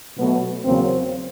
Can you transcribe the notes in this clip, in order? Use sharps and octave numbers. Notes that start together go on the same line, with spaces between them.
B2 F#3 A3 B3
E2 C#3 F#3 A#3 C4